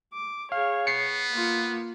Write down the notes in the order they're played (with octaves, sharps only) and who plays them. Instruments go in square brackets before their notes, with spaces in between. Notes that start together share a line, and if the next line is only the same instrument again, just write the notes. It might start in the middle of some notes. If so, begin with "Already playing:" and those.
[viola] D6
[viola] G#4 C#5 [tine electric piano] F5
[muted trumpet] B3 [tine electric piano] C7 C#7
[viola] A#3 F4